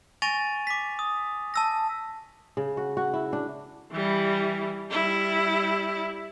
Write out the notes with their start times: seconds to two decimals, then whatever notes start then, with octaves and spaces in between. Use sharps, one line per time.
0.22 G#5 C#6 A6 A#6 D#7 F7
0.67 D6 B6
0.99 D#6
1.54 A5 E6 A#6
2.57 C#3
2.77 F#4
2.97 F#4
3.14 E4
3.33 D4
3.92 E3 G3
4.91 G3 E4